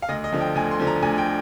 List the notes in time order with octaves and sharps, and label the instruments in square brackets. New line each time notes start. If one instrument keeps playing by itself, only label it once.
[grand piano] F5
D2 D#5
D#5
D3 F3
G5
D2 G#5
C6
D3 F3
A#5
D2 G#5
G5